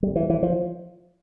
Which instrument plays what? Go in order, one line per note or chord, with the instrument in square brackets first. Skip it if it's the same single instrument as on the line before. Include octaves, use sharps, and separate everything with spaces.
[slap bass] G3
E3
E3
F3